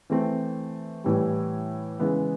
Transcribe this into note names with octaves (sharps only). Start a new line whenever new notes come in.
E3 A3 C4
A2 E3 G3
C#3 E3 G#3 B3